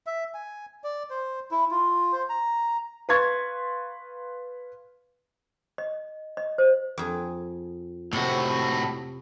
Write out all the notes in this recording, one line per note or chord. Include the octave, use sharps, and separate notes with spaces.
E5
G#5
D5
C5
E4
F4
C5
A#5
B4 F5 C6 C#6 G#6 A6
D#5
D#5
C5
F2 G#4
A2 C3 F#4